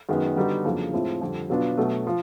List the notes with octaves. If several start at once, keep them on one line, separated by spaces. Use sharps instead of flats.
F#2 D#3 G#3 B3
D3 G3 B3 D#4 F#4
F2 C#3 F#3 A#3 D4
A2 F3 G#3 C4 E4
F2 D3 G3
B2 F#3 B3 D4 F4
B2 F#3 A3
F3